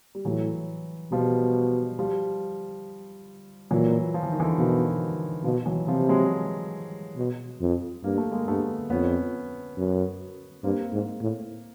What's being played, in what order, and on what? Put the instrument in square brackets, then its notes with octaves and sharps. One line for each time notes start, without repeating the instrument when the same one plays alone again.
[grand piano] G3
[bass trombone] A2 [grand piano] E3 F#3
[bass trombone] B2 [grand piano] F3 G3
[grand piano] F3 G3
[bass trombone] A#2 [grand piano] E3 F#3
[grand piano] F3
E3
D#3
D3 E3
[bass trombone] B2 [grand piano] D#3 F3
[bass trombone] B2 [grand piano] D#3 F3
[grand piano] E3 F#3
[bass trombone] C3 [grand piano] F3 G3
[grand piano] F#3 G#3
[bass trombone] B2
F2
[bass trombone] G2 [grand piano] A#3
[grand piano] A3
G#3 A#3
[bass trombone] G2 [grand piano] A3 B3
[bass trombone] F2 [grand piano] B3 C#4
[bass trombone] F#2
[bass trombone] G2 [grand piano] A#3 C4
[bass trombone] G#2
A2